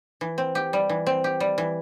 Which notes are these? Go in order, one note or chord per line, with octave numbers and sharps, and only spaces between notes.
E3
C4
G4
G3
E3
C4
G4
G3
E3